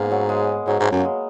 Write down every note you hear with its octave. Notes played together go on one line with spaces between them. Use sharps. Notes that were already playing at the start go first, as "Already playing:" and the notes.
Already playing: G#2 A#3 B3
F#3
G#3
G#2 F#3
G#2
F#2
A#3
G#3